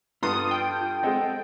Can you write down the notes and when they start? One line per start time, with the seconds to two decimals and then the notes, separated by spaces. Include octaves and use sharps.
0.23 G2 B3 F4 A4 C6 D#6
0.51 G5
1.03 G#3 C4 A4 D#5 F#5